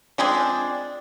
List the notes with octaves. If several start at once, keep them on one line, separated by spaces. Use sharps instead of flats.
F3 G#3 C4 D4